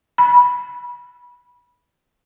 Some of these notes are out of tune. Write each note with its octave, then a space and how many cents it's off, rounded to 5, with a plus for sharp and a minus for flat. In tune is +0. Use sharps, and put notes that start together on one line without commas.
B5 -15